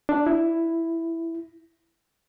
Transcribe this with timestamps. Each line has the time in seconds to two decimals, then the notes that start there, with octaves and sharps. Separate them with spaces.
0.09 D4
0.26 E4